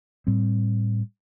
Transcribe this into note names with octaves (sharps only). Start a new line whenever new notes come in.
A2 G3 C4